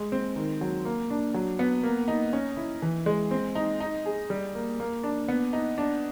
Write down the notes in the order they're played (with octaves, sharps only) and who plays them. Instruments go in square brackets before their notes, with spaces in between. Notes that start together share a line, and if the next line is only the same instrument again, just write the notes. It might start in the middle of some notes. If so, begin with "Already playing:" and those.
Already playing: [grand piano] G#3
C4
D#3
F#3
A#3
D4
F#3
B3
A#3
D#4
C#4
E4
E3
G#3
C4
D#4
D#4
G#4
G3
A#3
A#3
D4
B3
D#4
D4